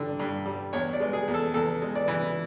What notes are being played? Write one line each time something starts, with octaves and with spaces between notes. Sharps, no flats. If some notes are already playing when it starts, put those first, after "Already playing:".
Already playing: G2 D3
G2
G3
E2 C#5
D5
G#3
G#4
E2
A4
E2 A4
G#3
D5
E3